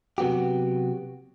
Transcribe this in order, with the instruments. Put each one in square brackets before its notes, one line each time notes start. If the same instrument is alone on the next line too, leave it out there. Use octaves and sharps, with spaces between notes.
[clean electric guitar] C3 F#3 B3 F#4 G4